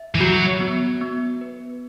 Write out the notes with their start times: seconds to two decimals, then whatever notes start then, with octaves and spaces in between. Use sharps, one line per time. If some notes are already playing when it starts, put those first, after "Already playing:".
Already playing: E5
0.15 E3
0.20 F#3 F#4
0.60 B3
1.01 B3
1.41 B4